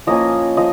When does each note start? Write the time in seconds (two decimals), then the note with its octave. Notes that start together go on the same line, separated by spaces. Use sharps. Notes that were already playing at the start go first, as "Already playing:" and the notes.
0.07 F3 A#3 C#4 F4 D#5
0.57 F3 D#5